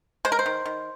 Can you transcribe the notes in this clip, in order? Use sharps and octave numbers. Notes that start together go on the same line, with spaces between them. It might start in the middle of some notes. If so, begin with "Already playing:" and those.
G#3 C5
A#4
C5
D#3
D#3